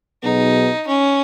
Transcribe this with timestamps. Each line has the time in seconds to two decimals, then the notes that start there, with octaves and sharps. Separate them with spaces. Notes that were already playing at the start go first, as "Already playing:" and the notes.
0.23 B1 B2 B3 D#4 G#4
0.87 C#4